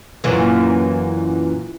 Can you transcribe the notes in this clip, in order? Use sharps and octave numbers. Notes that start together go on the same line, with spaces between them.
F#2 A#2 E3